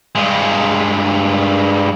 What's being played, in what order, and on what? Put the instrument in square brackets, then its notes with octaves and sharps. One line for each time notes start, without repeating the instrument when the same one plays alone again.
[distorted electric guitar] G2 G#3